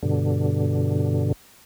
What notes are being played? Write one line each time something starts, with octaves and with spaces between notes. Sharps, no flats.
G2 B2 D3